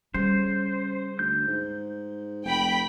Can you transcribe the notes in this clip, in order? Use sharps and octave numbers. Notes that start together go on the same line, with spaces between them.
C#3 G3 C5
D2 G6
G#2
F1 G5 B5